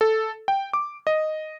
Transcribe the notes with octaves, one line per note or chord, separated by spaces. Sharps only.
A4
G5
D6
D#5